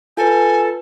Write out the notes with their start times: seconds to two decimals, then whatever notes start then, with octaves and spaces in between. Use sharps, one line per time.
0.17 F4 A4 B4 G#5